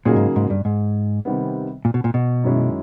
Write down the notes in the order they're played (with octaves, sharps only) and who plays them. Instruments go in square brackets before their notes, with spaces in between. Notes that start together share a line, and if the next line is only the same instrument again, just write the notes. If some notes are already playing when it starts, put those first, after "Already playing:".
[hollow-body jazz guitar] A#2 [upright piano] C#3 F#3 A#3 D#4 G#4
[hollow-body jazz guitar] G#2
G#2
G2
G#2
[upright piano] C3 D#3 G3 B3
[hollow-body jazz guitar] A#2
B2
A#2
B2
[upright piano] F#2 D#3 G#3 C#4 E4